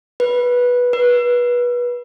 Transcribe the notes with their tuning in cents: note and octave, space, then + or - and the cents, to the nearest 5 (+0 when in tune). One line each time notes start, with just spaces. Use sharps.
B4 -10
B4 -25